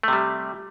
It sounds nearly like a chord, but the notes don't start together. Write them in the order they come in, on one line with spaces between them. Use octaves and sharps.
A3 C3 G3